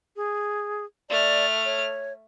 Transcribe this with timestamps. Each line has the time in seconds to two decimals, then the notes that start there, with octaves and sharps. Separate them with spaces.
0.16 G#4
1.09 A3 D5 F6
1.65 C#5